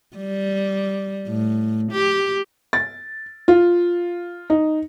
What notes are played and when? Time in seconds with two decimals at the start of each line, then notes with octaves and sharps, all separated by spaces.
0.17 G3
1.28 A2
1.92 G4
2.73 A6
3.48 F4
4.50 D#4